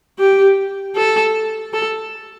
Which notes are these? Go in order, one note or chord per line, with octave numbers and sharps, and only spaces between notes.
G4
A4
A4